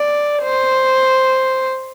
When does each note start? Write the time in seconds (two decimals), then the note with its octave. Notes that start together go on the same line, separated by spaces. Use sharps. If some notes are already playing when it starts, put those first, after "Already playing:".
Already playing: D5
0.43 C5